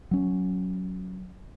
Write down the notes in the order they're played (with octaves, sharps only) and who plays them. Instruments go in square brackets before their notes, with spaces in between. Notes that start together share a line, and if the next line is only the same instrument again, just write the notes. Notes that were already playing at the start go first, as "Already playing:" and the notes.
[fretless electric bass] F#3 C#4